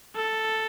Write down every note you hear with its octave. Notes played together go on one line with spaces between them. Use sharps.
A4